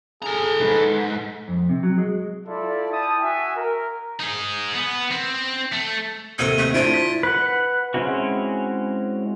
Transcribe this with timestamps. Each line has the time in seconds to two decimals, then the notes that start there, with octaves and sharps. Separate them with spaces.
0.22 G#4 A4 A#5
0.61 D#2 G#2 B4
1.48 F2
1.69 C3
1.83 F#3
1.98 G#3
2.47 E4 F4 A4 D5
2.91 E4 G5 A5 D#6
3.23 F#4 E5 G#5
3.56 A#4
4.20 D#4 G#4
4.74 B3
5.11 C4
5.73 A3
6.39 D#2 C3 A4 G#6 D#7 G7
6.58 A3
6.74 D4 E4 F4 C5 D7
6.94 B6
7.23 B4 F#5
7.94 G#3 C4 C#4 E4 F#4